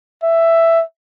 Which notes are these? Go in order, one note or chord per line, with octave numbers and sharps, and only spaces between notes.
E5